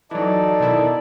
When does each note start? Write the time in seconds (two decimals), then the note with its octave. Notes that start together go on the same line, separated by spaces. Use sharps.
0.11 E3 F#3 D#4 A4 D5
0.60 B2 D#3 E4